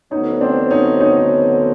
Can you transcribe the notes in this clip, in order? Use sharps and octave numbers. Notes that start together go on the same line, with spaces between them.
D2 D3 F#3 B3 C#4 D#4
C4 D4
C#4 D#4
C#4 D#4